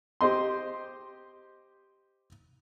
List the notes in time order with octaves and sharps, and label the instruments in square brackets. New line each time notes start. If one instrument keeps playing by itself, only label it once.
[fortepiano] G4 C5 D#5 C6